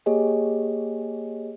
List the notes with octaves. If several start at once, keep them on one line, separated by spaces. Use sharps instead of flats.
A#3 G4 G#4 C#5 D#5 G#5